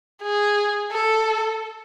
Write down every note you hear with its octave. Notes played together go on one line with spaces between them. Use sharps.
G#4
A4